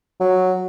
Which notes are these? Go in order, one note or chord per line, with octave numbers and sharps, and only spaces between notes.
F#3